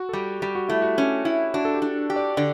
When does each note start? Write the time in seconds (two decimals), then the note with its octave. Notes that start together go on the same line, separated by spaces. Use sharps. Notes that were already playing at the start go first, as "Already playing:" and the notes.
Already playing: F#4
0.09 A4
0.13 G3 G4
0.42 G3 G4
0.55 F#4
0.69 A3 E4
0.82 F#4
0.98 C#4
1.25 E4
1.54 D4 F#4
1.65 A4
1.74 G4
1.82 D4
2.10 G4
2.16 D5
2.37 D3 D5